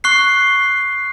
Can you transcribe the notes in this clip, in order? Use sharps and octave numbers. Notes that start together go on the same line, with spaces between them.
C#6 F#6 C7